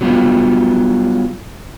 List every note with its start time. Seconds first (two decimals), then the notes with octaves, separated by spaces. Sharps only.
0.01 F#3 G3 B3 F4